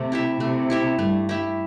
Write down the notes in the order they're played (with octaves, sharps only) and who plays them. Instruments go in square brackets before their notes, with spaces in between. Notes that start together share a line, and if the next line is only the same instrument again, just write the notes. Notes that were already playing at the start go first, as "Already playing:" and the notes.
Already playing: [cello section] C3 [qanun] A3
[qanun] E4 G4 E5
[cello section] C3 [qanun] A3
[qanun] E4 G4 E5
[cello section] G2 [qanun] A3
[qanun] E4 G4 E5